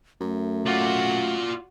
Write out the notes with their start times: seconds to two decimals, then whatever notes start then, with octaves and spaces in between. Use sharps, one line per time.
0.21 F#2 A3
0.66 F4 F#4 D5